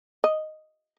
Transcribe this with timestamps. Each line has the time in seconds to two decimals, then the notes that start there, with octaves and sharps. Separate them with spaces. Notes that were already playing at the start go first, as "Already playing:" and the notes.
0.24 D#5